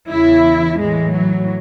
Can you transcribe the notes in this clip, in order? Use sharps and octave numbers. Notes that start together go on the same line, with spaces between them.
E2 C#3 E3 E4
A2 E3 G#3
F#3